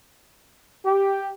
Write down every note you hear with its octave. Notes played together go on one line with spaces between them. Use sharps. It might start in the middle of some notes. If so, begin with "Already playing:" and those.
G4